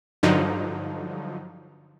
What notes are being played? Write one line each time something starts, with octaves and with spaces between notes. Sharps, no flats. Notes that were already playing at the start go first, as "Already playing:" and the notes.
G2 D3 F3 F#3 D#4